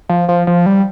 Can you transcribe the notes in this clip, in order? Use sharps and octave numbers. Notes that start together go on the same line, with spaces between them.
F3
F3
F3
G3